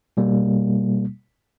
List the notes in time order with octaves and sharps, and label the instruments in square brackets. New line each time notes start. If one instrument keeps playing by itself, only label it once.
[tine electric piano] B2 G3 A#3